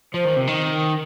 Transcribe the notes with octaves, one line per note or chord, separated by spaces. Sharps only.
F3 C5
D#3
C3
D#3